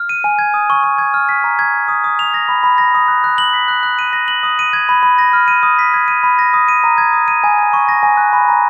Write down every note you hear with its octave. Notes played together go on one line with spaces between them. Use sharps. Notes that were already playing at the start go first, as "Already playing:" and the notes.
Already playing: F6
D#7
G#5
G#6
D#6
C#6
C#6
G#6
F6
B6
A#5
G#6
C#6
D#6
D#6
F7
A#6
B5
B5
A#6
D#6
F#6
F#6
F#7
B6
F#6
F#6
D#7
A#6
F#7
D#6
D#7
G#6
B5
B5
A#6
F6
D#7
D#6
B6
G#6
D#7
B5
A#6
D#6
D#7
A#5
G#6
D#6
D#7
G#5
G#6
C#6
A#6
G#5
F#6
B5
A#5